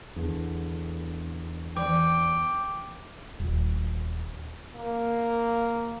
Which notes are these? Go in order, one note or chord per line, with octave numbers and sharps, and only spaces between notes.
E2 D3
E3 D5 G5 D6
D#1
A#3